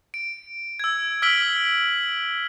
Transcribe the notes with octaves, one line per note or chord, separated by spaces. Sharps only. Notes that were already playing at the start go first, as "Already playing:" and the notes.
D7
E6 G#6
E6 F6 B6 D7 F#7 G7